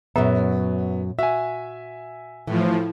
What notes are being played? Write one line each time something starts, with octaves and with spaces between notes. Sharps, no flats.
F#2 A#2 F#3 B3 E5
F#4 E5 G#5
A2 E3 F3